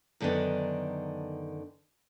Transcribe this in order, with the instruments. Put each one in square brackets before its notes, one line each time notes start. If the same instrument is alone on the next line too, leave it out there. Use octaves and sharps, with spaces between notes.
[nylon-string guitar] F#2 D3 D#3 B3 D4